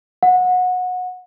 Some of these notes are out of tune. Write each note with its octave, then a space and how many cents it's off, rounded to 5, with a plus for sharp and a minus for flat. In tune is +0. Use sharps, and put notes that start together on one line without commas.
F#5 -25